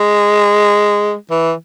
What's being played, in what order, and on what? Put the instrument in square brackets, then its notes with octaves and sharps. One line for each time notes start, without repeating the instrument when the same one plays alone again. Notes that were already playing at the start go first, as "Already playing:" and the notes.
Already playing: [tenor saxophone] G#3
E3